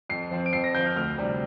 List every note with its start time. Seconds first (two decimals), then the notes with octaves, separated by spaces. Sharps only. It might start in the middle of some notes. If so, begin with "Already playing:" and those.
0.09 F2 C7
0.31 F3 C4
0.46 D7
0.53 F2 C7
0.64 A#6
0.74 F3 C4 G6
0.86 F6
0.96 D2 F6
1.18 C3 G3 D4